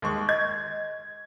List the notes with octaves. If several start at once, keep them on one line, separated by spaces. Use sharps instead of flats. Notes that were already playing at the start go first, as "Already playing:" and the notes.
D#2 G#3 C#6
D#5 G#6